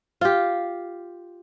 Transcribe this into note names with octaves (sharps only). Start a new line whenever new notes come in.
F4 G4